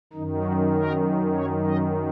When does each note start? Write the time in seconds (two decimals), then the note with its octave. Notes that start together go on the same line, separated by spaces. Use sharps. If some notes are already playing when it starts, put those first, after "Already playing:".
0.13 F#2 D#3 D#4
0.43 F#4
0.74 A#4
1.36 C#5
1.67 D#5